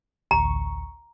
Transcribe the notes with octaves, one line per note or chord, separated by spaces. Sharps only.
A1 D2 A#5 C#6